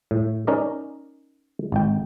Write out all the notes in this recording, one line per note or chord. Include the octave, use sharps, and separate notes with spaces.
A2
C#4 D#4 A#4 D5 D#5
G#1 G5